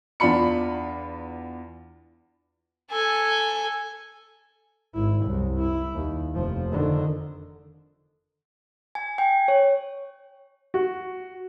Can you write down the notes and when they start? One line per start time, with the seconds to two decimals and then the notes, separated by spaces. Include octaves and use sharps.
0.20 E2 D4 F4 B5 C#7
2.91 A4 G#5
4.94 G#1 E4
5.26 C2 F#2
5.60 E4
5.94 D#2
6.34 F1 F3
6.72 D3 D#3
8.95 G#5
9.18 G5
9.48 C#5
10.74 F#4